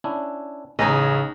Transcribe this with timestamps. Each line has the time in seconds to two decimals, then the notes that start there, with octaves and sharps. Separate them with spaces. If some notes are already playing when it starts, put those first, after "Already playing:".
0.04 C#4 D4 E4
0.79 A1 C#3 C#4 D#4 D#5 G#5